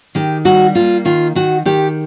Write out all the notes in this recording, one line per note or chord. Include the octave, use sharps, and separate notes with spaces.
D#3 G4
G3 F#4
A#3 F4
D#3 F4
D#3 F#4
D#3 G4